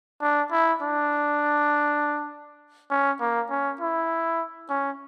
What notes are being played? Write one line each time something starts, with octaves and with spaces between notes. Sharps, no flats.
D4
E4
D4
C#4
A#3
C#4
E4
C#4